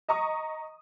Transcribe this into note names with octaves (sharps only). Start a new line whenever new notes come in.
D#5 A#5 C#6 D#6